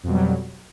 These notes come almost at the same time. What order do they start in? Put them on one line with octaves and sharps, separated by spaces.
F2 B2 G3 F#3